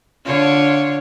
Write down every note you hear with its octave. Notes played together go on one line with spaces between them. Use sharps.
D3 F4 C#5